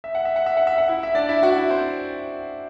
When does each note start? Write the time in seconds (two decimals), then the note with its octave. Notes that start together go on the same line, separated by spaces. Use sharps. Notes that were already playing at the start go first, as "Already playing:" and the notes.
0.04 E5
0.15 F#5
0.25 E5
0.36 F#5
0.46 E5
0.57 F#5
0.67 E5
0.78 F#5
0.88 E4 E5
1.03 E5
1.15 D4 D5
1.29 E4 E5
1.43 F#4
1.57 E4
1.70 C4 C5